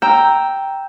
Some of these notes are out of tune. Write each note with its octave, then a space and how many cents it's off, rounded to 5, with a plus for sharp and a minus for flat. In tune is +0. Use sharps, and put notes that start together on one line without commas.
G5 +0 A#5 +0 E6 -5